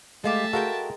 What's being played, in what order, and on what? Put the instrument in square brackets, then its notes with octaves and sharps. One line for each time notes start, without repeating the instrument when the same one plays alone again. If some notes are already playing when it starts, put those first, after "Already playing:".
[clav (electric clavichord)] G#3 [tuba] A3 [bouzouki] G4 F5 G#5 [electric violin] E5 A5
[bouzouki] G#3 A#4 G5 [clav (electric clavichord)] F#4 A4 F5